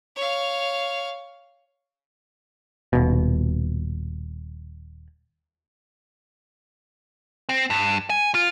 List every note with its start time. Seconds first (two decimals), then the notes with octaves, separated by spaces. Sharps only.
0.16 C#5 F5
2.93 D#1 B2
7.49 C4
7.70 G2
8.10 G#5
8.35 F4